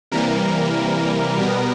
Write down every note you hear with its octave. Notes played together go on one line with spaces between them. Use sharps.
C3 E3 G3 A#3 A#4
B2 G3 B3